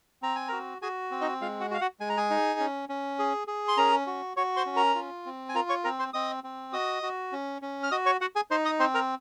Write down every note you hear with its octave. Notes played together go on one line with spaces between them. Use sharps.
C4 A#5
G#5
F#4 A#4 A#5
F#4 G#4 G#5
C4
D#4 D#5
G#3 F4 F5
F#4 F#5
F#4
F5
F#4 F#5
G#3 G#5
A#5
G#4 G#5
D#4
C#4
C#4
G#4
G#4
C6
C#4 A#4 A#5
F#4
F#4 C#5 C#6
C5 C6
C#4
A#4 A#5
F4
C4
G#5
F4 A#4 A#5
C#5 C#6
C4 A#4 A#5
C5 C6
C4 D#5 D#6
C4
F#4 D#5 D#6
F#4
C#4
C#4
F6
F#4 D#5 D#6
C#5 C#6
F#4 F#5
G#4 G#5
D#4 C5 C6
D#5 D#6
C4 C5 C6
A#4 A#5